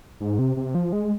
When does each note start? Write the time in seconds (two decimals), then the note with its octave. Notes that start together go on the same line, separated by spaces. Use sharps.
0.21 G#2
0.39 C3
0.57 C3
0.75 F3
0.93 G#3